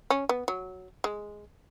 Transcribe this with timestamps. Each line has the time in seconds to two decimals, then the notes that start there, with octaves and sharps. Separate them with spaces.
0.10 C#4
0.29 B3
0.48 F#3
1.04 G#3